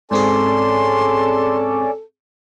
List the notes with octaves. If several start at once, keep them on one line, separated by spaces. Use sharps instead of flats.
G#2 C4 C#4 G#4 A4 D5 C6